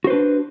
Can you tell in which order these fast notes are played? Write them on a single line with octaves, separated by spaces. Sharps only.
F#4 C5 B4 D4